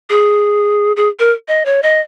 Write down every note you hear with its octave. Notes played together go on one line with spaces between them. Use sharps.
G#4
G#4
A#4
D#5
C#5
D#5